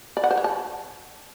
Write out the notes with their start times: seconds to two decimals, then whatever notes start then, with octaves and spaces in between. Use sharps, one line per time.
0.17 D5
0.24 F#5
0.31 C5
0.37 C#5
0.44 A5